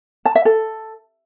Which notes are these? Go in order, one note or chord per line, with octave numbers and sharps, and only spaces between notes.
A5
E5
A4